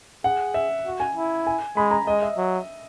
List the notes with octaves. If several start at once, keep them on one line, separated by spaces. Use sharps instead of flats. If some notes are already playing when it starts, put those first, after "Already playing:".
G#4 F#5
E5
F#4
G#5
E4
G#5
G#3 B5
A#5
G#3 D#5
E5
F#3